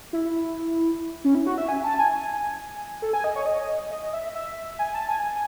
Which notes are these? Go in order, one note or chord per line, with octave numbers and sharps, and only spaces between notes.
E4
C#4
E4
F#4
E5
G#5
A5
G#5
A4
G#5
D#5
C#5
D#5
D#5
E5
E5
G#5
A5
G#5